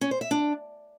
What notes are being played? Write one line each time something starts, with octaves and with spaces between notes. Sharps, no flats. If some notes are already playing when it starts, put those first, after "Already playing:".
C#4
C5
E5
D4